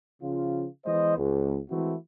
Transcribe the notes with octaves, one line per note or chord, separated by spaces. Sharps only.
C#3 F3 F4
E3 G#3 B3 C5 D#5
C#2
E3 G#3 A3 C4 E4 F#4